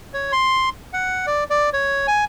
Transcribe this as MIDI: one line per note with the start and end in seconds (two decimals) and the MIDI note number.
0.14 0.32 73
0.32 0.69 84
0.93 1.26 78
1.27 1.44 74
1.50 1.70 74
1.73 2.07 73
2.07 2.25 80